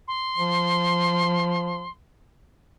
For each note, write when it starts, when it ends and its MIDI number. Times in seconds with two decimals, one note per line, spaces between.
0.07 1.89 84
0.38 1.86 53